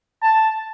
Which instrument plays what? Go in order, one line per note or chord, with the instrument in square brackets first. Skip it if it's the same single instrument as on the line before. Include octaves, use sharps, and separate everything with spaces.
[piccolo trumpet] A5